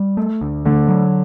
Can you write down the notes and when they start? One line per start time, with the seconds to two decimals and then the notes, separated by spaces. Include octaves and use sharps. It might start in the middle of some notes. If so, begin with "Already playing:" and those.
Already playing: G3
0.17 A3
0.41 D2
0.65 D3 A3
0.88 F#3